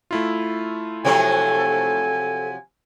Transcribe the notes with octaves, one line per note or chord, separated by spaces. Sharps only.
A3 E4 F4
C3 F3 F#3 A4 G#5